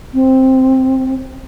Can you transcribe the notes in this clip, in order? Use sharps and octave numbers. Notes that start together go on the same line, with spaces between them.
C4